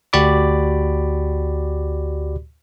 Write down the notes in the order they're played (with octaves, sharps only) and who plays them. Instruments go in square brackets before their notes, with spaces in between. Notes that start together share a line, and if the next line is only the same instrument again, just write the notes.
[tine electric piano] D2 F#4 G4 D5 B5 D6